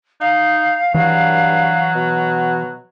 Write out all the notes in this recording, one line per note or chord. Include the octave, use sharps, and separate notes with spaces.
D#4 F5
G2 E3 F#3
B2